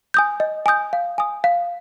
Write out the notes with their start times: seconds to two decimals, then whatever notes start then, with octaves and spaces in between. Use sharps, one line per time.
0.14 G#5 D#6 G6
0.40 D#5
0.66 G#5 D#6 G6
0.93 F5
1.18 G#5 D#6
1.44 F5